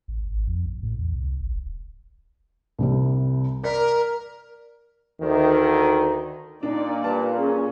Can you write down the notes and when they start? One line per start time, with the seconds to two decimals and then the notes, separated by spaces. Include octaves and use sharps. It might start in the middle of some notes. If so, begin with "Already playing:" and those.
0.08 A1
0.25 G#1
0.47 F2
0.66 A#1
0.83 A2
0.99 E2
1.15 C2
1.40 G1
1.54 D#1
2.78 C2 C3 G3
3.63 A#4 D5 B6
5.21 D2 D#3
6.63 A#2 D4 D#4 D5
7.04 G3 B4 A5
7.38 C#4 G#4